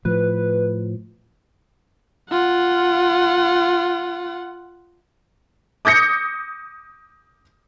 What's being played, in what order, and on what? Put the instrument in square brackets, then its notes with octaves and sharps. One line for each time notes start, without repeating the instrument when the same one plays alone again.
[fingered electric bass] A2 F3 [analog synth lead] B4
[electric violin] F4 F#5
[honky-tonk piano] D6 D#6 G6 A#6 C#7